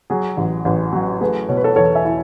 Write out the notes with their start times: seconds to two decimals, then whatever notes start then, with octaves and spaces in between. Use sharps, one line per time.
0.10 F#3 G#4
0.37 A1
0.65 A1
0.93 F#3
1.21 A3 G#4 B4
1.49 B2 C#5
1.57 B4
1.64 A4 C#5
1.72 B4
1.76 E2 A4 C#5
1.95 E5 G#5
2.05 E4